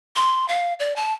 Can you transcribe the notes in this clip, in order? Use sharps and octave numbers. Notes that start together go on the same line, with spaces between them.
C6
F5
D5
A5